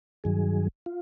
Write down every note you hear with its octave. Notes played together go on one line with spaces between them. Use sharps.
G2 D#3 F#3 G#4
F4